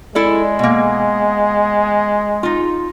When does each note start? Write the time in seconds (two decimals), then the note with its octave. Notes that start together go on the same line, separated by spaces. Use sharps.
0.15 G#3 E4 A4 D5
0.59 B2 A#3
2.43 D#4 F4